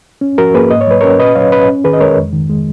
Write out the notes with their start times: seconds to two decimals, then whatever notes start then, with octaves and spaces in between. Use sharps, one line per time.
0.21 C#4
0.38 F3 F#4 A#4
0.54 A#3 G#4 B4
0.71 G#2 D#5
0.81 C#5
0.87 F#3 B4
1.01 C#4 A#4 C#5
1.20 A#2 B4 D#5
1.35 F#3 C#5 F5
1.52 C#4 B4 D#5
1.68 C#4
1.84 D#3 G#4 B4
1.93 D#5
2.01 G#3 A#4 C#5
2.17 F2
2.33 D#3
2.50 G#3